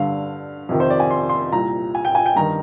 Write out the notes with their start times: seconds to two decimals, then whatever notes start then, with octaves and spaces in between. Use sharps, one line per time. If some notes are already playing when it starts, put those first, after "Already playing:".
Already playing: G2 D3 F5
0.69 F2 C3 D#3
0.80 C5
0.90 D5
1.00 G#5
1.11 C6
1.29 C6
1.52 C2 A#2 A#5
1.95 G#5
2.05 G5
2.15 G#5
2.26 G5
2.36 G2 D#3 A#5